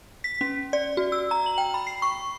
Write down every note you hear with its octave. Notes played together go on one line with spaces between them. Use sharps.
B6
C#4
D5
F#4
E6
A#5
F#7
G5
B5
C7
C#6